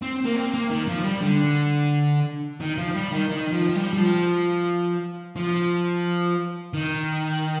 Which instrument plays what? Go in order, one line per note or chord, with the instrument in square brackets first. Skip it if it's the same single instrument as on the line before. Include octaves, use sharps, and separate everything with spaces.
[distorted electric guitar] C4
A#3
C4
A#3
D#3
F3
G3
D3
D#3
F3
G3
D#3
D#3
F3
F3
G3
G3
F3
F3
D#3